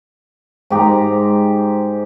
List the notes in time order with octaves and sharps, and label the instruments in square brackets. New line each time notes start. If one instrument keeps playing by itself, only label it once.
[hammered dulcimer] G#2 G4 A#5